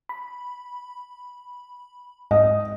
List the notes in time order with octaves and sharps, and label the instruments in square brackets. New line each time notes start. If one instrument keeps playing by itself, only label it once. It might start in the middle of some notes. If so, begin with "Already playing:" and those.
[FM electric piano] B5
[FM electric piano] G#2 [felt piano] D#5